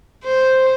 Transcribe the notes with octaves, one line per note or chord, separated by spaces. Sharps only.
C5